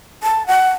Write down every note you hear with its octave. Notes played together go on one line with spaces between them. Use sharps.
A5
F#5